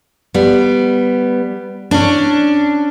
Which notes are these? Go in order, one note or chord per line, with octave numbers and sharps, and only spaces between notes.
G3 B3
C#4 D4